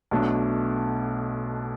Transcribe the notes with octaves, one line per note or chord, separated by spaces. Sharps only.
B1 B2 A3 D4